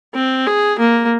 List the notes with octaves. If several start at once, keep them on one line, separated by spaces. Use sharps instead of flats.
C4
G#4
A#3